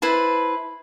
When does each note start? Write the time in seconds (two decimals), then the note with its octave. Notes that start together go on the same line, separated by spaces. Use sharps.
0.02 E4 B4 C5 A5